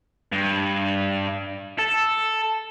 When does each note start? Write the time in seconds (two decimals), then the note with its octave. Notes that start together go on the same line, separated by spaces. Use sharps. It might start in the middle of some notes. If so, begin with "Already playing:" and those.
0.33 G2
1.78 A4